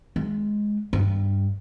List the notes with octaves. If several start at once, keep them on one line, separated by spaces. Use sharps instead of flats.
G#3
G2